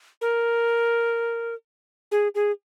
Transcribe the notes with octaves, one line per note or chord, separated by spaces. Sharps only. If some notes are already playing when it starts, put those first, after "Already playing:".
A#4
G#4
G#4